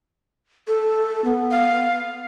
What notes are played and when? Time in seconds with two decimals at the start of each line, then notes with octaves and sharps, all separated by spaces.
0.67 A4
1.25 B3
1.51 F5